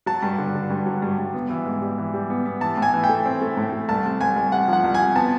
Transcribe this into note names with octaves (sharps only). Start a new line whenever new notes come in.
F#3 A5
G2
D3
D3
G2
F#3
G2
G2
B3
E3
G#2
G3
E3
G3
B3
B3
E3 A5
A2 G#5
E3
G5
A3
C4
A3
A2
A3
C2 A5
C3
C2 G#5
C2
C3 F#5
F3 F#5
C2
G#5
C3
B3 A5